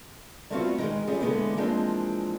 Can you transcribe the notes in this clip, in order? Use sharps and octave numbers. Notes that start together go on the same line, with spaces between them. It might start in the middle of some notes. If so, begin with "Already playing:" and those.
G3 A3 B3 C4 F4 F#4
D#3 E3 G#3
G3 C4 C#4 F4 G#4
A2 D3 E3 G#3 A#3 B3
E3 F3 G#3 A#3 C4 D4